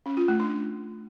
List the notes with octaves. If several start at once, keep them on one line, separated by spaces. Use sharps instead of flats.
C#4
F4
A3
D4